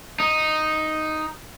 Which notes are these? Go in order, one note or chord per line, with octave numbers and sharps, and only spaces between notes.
D#4